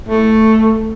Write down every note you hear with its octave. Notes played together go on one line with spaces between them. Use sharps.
A3